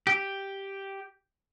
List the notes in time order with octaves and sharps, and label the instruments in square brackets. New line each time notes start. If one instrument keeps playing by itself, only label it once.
[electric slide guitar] G4